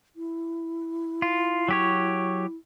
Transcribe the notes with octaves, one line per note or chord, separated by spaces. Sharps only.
E4
F4
F#3 G4 C#5